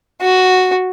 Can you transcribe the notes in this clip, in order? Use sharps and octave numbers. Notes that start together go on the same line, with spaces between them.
F#4